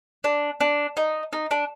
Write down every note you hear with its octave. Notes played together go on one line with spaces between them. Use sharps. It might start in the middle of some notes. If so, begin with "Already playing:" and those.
D4
D4
D#4
D#4
D4